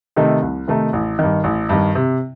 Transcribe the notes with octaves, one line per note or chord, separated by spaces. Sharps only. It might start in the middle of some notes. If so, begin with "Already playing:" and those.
C3 D#3 A3 D#4
C2
C3 D#3 A3 D#4
A1
G2 D#3
A1
G2 D#3
C3